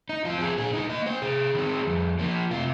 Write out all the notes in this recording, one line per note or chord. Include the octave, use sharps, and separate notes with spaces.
D#4
F3 C4 F4
G#4
A#2 G#4
D#4
A#3 D#5
C5
C3 G#4
D#3 C4
F2
F3 A#3
C3 F4